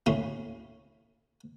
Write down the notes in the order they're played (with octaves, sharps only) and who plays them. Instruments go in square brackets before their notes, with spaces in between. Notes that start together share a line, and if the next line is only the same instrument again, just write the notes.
[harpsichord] D2 A2 C#4